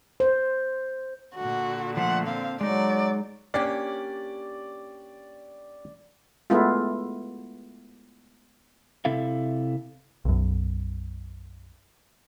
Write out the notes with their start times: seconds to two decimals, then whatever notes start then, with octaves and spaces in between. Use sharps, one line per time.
0.20 C5
1.35 A#2 D3 F#4
1.97 F3 A3 C5 F#5
2.28 C4 F5
2.61 F#3 G#3 D#4 D5
3.54 A#3 C#4 D4 G4 C#5 D5 G#5
6.50 G#3 A3 B3 E4 F4
9.05 C3 C4 E4 A4 E5 F5
10.25 B1 F#2